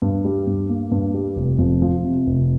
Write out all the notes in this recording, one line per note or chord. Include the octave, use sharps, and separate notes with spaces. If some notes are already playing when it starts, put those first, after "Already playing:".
G2
G3
G2
A#3
G2
G3
F1
F2
F3
C3
F1